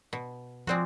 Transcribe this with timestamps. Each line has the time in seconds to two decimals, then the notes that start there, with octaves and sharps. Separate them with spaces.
0.13 B2
0.67 F3 G#3 C4 F#4 D5